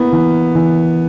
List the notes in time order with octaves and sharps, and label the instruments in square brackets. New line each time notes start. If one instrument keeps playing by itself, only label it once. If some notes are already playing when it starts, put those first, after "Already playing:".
Already playing: [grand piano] A#3 E4 [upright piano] B3
[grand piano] E3
E3